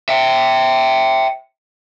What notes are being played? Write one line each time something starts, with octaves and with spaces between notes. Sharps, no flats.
E5 G5